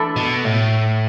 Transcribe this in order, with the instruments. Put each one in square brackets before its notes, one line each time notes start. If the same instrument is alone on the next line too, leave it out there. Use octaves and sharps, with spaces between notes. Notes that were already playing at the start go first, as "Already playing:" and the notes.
Already playing: [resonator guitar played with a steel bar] E3 A3 D4 A4
[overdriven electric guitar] B2
A2